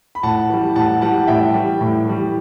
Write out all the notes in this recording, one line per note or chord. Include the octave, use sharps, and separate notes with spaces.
B5
A2 F#5 A5
E3 G3
A2 F#5 A5
E3 G3 F#5 A5
A2 E5 G5
E3 G3
A2
E3 G3